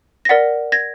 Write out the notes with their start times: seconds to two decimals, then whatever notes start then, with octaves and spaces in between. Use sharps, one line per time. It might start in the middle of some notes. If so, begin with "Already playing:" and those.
0.25 A#6
0.29 A#4 D5 F#5 A6 B6
0.72 G#6 A#6